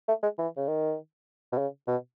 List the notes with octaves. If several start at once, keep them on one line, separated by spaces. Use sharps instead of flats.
A3
G#3
E3
C#3
D#3
B2
C#3
B2